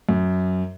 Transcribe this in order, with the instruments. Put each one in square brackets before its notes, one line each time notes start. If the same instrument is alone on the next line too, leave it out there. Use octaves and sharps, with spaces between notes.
[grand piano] F#2